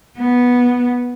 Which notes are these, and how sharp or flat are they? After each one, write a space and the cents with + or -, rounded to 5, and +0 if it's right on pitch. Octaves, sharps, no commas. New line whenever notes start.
B3 -10